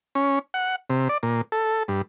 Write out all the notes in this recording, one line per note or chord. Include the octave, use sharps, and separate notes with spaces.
C#4
F#5
C3
D5
A#2
A4
G2